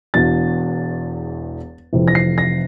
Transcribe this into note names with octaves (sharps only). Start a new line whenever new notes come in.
E1 E2 E3 A6
F1 F2 C3 E3
A#6
C7
A#6